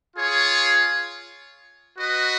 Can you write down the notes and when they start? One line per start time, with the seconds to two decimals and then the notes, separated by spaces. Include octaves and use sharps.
0.15 F4 G#4 C#5
1.97 F#4 B4 D#5